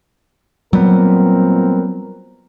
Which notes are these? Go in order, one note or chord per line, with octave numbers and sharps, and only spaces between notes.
A#2 F#3 G3 B3 C4 A#4